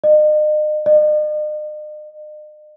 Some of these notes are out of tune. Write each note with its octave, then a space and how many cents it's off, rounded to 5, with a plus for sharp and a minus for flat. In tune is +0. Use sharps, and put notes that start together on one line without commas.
D#5 -40
D#5 -45